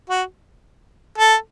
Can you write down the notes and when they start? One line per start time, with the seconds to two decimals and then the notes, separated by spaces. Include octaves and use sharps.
0.10 F#4
1.18 A4